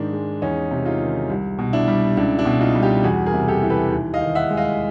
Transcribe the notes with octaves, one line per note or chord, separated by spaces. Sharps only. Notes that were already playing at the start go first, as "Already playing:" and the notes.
Already playing: G#2 D#3 D4
G#3
E2 C#4 D#4
C3
D#4 F4
D#3
C2
B2
D4 E4
G3
C#2 D4 E4
D4 E4
B2
D#4 F4
G3
F4 G4
E2 F#4 G#4
G#4 A#4
C3
G4 A4
E3
A4 B4
D#2
D#5 F5
D#3
E5 F#5
G#3
D#5 F5